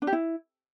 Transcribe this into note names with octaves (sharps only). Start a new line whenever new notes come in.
D4
G4
E4